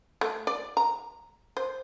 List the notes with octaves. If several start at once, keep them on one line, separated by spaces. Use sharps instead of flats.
A3
D5
A#5
C5